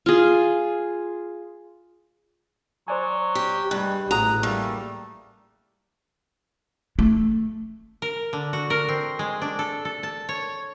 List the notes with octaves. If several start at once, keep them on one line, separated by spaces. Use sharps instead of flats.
F4 G#4
F#3 C5 D5 G#5
G4
G2 G3 G#3 F#6
A1 A2 F#4 G#4 F#5 A#5 D#6
G3 A3 A#3
A3
A#4
D3
F#4
A#4
C4
G#3
D4
A4
A4
A5
C#5